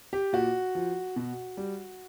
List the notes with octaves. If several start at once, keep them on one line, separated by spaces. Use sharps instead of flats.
G4
A#2 F#4
F3
B2
G3